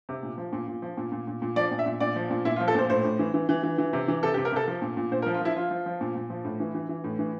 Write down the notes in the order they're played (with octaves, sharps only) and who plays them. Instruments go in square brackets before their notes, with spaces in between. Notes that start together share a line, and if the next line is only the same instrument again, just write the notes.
[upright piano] C3
A#2
F3
A#2
A#2
F3
A#2
A#2
A#2
A#2
F3 D5
A#2
E5
A#2
A#2 D5
F3
A#2
A#2 E4
F4
F3
A4
A#2 C5
A2 C5
A2
E3
E3
E3
E3
E3
C3
E3
C3 A4
G4
C3
A#4
C3 A4
F3
A#2
A#2
A#2 C5
A#4
F3
F4
F3 E4
F3 F4
F3
F3
A#2
A#2
F3
A2
E3
E3
E3
A2
E3